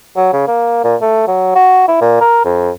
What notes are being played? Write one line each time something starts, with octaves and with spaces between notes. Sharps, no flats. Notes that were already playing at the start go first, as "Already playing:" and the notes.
F#3
C#3
A#3
A#2
A3
F#3
F#4
E4
A#2
A#4
F2